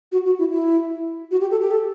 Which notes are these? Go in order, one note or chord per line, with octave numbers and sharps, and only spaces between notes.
F#4
F#4
E4
E4
F#4
G4
A4
G4
A4